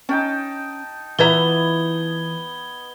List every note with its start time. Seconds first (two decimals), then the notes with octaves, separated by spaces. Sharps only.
0.09 C#4 D#4 G5 A5
1.19 E3 B3 F4 B4 E5 A#5 G#6 G7